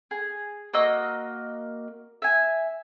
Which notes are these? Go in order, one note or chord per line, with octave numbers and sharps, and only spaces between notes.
G#4
A#3 F#4 D#5 E6
E5 G#5